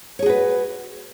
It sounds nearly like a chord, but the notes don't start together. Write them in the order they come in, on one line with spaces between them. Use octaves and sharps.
C#5 G#4 F#4 B4